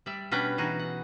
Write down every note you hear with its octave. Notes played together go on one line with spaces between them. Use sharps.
G3 D5 E5
B2 G3 C#4 D4 B4 G5
E3 D#4 F#4 G#4
F#5